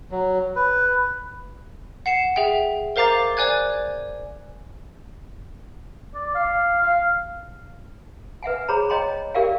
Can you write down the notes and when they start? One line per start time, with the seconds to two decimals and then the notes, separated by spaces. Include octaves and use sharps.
0.11 F#3
0.56 B4
2.06 F#5 C7 E7
2.36 G#4 E5 G5
2.96 A#4 C5 F5 A#5 D6 A6
3.37 C5 D5 G#5 F#6 G#6
6.15 D5
6.35 F5
6.81 F5
8.43 B4 E5 F#5 G#5
8.68 G#4 C5 C#5 A#5 B5
8.90 C#5 D#5 G5 A#5 C6
9.34 G4 A#4 D5 E5 F5 G5